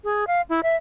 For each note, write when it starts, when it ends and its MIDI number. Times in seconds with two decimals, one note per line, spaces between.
0.04 0.24 68
0.27 0.41 77
0.49 0.60 64
0.63 0.76 76